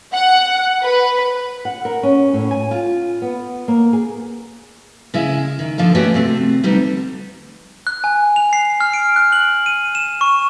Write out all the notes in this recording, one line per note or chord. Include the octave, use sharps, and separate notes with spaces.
F#5
B4
F#5
A#4
C#4
A2
G#5
F4
B3
A#3
G#4
C#3 G#3 E4
D#3
D3 F3 F4 A4
G#3 A3 B3 C#4 F#4 G4
C3 A3 C4
D2 G3 B3 D#4 G4
F#6
G#5
F7
C7
F6
D7
F#6
F#7
D#7
E7
C#6